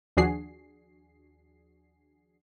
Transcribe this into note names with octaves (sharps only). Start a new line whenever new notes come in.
D#2 F3 D4 F#4 G#4 C7